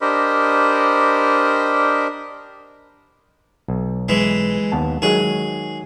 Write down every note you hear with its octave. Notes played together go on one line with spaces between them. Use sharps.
D4 G4 A#4 C5 D#5 B5
B1
E3 G#3
D#2 B3 A5
D#3 F#3 G#3 G#4